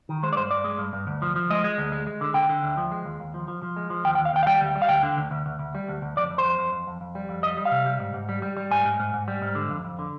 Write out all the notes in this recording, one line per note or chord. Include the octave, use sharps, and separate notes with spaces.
D#3
G#3 C5
D5
G2 C5
G2 D5
G#3
G2
G2
D2
F3
F3
G#3 D#5
G#3
D2
G#3
G#3
D3
D3 G5
D3
D2
F3
G#3
D#2
D#2
F3
F3
F3
G#3
F3
D#2 G5
G5
D#2
F5
D#2 G5
F5
G3 G5
D2
G3
F5
D2 G5
D3
D2
D2
D2
D2
G3
D2
D2
F2 D5
F2
C5
F2
F2
F2
F2
F2
G3
F2
G3 D#5
G3
F5
C3
G3
G#2
G#2
G3
G3
G3
G#2 G#5
G#2
G#2
G#2
G3
G#2
D3
F2
F2
D3